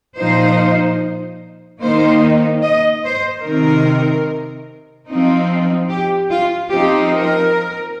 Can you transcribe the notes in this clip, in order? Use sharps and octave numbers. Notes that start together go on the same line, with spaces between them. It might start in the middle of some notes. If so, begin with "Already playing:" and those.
A#2 F3 D#4 C5
D#3 A#3 D#4 C5
D#5
C5
C3 D#3 C4 D#4 A#4
F3 C4 D#4
G4
F4
F3 C4 D#4 G4
A#4